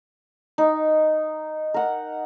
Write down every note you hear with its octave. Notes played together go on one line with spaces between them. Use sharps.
D#4
A#4 F#5